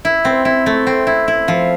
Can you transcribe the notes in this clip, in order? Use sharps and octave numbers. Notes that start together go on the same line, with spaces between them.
E4
C4
E4
A3
C4
E4
E4
F3